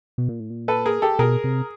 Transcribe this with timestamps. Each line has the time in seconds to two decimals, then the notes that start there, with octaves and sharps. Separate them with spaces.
0.18 B2
0.29 A#2
0.40 A2
0.50 A#2
0.68 A4 B4
0.86 G#4 A#4
1.02 G4 A4
1.19 B2 G#4 A#4
1.44 C3